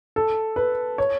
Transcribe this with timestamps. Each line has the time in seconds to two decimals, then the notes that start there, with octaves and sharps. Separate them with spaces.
0.16 A4
0.56 B4
0.98 C#5